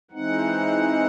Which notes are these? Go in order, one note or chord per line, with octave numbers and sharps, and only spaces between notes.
E3 G#3 C4 D#4 F#5